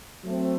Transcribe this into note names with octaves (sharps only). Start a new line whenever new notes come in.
F#3 A3 C4